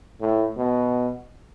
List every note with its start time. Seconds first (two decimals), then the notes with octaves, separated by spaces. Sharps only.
0.21 A2
0.57 B2